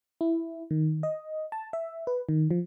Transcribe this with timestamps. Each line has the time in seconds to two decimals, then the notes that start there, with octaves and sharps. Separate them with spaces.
0.21 E4
0.71 D#3
1.03 D#5
1.52 A5
1.73 E5
2.07 B4
2.29 D#3
2.51 F3